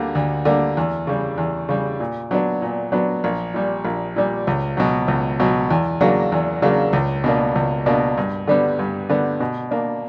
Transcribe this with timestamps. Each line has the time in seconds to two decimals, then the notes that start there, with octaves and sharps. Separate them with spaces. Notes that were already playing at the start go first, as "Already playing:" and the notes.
Already playing: D2 D3 G3 A#3
0.15 D2
0.45 D3 G3 A#3
0.77 E2
1.07 C#3 G3
1.38 E2
1.69 C#3 G3
2.00 A#2
2.31 F#3 B3 D4
2.62 A#2
2.92 F#3 B3 D4
3.24 A#1
3.54 A#2 G3
3.85 A#1
4.16 A#2 G3
4.47 C#2
4.77 B2 F#3
5.08 C#2
5.40 B2 F#3
5.70 E2
6.01 C#3 F#3 A#3 D4
6.32 E2
6.62 C#3 F#3 A#3 D4
6.93 C#2
7.24 B2 A#3 D4
7.55 C#2
7.86 B2 A#3 D4
8.17 G2
8.48 D3 G3 B3
8.79 G2
9.10 D3 G3 B3
9.40 B2
9.71 A#3 D4